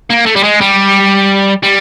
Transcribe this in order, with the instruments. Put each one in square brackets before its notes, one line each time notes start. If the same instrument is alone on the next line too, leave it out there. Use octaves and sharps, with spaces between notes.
[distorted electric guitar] A#3
A3
G3
G#3
G3
G3